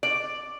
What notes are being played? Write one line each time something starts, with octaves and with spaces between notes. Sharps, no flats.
D5